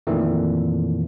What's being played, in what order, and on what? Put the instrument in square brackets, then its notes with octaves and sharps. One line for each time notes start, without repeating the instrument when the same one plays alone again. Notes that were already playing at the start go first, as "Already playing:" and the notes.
[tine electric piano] F2 A#2 D#3 E3 A3